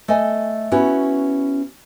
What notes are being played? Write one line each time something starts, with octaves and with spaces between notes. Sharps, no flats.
A3 D#5 G#5
B3 C#4 E4 F#4